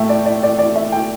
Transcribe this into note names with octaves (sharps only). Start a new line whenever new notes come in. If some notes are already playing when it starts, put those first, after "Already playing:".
Already playing: A2 A3 E5 G5
D5
D5
D5
D5
E5
G5